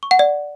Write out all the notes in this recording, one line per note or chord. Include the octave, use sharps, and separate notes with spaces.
C#6
F#5
D5